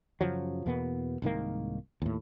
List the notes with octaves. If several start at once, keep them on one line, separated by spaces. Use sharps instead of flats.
F#2 C#3 F3 F#3
E2 B2 A#3 B3
C2 G#2 D#3 A#3
D#2 A2